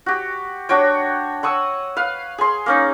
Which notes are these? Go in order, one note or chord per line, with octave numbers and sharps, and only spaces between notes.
F#4 G4
D4 F#4 C#5 G5
F#5 C#6 D#6 E6
B4 F5
G#4 C6
A#3 C#4 D#4